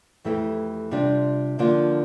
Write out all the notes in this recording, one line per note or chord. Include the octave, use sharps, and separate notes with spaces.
F2 E3 A3 E4 G4
C3 G3 D4 F4
D3 F3 A#3 D4 F4